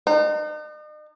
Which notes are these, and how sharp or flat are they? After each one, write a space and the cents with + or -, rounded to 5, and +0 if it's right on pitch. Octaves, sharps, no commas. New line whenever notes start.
D#4 -40